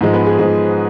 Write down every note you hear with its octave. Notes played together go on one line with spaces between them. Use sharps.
G#2 F3 G#3
B3 B4
G#4
G#2 F3 G#3 G#4